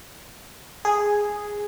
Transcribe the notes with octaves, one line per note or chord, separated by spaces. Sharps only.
G#4